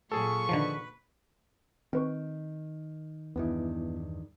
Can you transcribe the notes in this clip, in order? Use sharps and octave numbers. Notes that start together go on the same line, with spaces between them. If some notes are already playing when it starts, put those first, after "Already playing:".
A#2 F#3 G#4 A4 C#6
D3 D#3 F3 B4
D#3 C4 B4 C#6
E2 G2 D#3 B3 E4